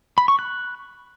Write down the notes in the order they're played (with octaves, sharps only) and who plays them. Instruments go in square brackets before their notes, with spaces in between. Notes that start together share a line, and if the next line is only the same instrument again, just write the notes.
[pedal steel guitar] B5
C#6
F#6